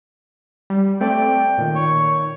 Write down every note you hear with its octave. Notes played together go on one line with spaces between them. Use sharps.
G3
A3 C4 D5 G5
A#2 D#3
C#5